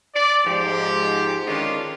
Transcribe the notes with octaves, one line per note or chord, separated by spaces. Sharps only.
D5
G#2 F3 G4
D3 D#3 G#3 C#4 D4 F4